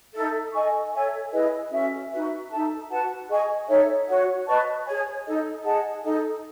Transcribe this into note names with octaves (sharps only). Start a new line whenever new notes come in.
D#4 A4 E5
A4 D#5 G#5 C#6
A4 C#5 E5 G#5
E4 G#4 B4 D#5
C#4 F#4 A4 E5
D#4 F#4 B4 E5
D#4 A4 E5 A5
F#4 B4 F#5 A5
G#4 D#5 G#5 C#6
D#4 A4 C#5 E5
F#4 C#5 F#5
B4 D#5 A5 C#6
G#4 C#5 G#5
D#4 A4 D#5
G#4 D#5 F#5 A5
D#4 A4 D#5